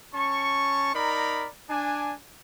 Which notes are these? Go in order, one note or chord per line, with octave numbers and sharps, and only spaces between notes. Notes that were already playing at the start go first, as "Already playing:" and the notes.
C#4 A5 C#6
D#4 A#4 D5 A#5 B5
D4 G#5